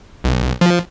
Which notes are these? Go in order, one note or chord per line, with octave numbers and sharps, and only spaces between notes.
B1
F3